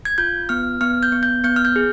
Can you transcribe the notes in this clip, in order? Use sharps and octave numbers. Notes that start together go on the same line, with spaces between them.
G#6
F4 G6
B3 F6
B3 F6
G6
B3
G6
B3 G6
F6
G6
G#4